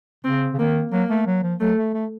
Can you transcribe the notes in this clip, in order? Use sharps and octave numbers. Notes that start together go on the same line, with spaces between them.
C#3 C4
C#3
D#3 A#3
F#3 A#3
A3
F#3
F3
F#3 A3
A3
A3